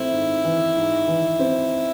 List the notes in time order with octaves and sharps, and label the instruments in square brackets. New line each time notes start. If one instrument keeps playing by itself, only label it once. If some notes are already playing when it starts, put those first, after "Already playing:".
Already playing: [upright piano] A3 C4 [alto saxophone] E4
[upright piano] G#2
E3
G#2
E3
C4